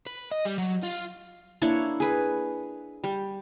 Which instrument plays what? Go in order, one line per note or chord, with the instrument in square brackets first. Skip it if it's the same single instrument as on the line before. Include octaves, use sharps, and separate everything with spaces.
[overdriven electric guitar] B4
D#5
G3
F#3
F4
[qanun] A#3 D4 E4 C#5
G#4 B4
G3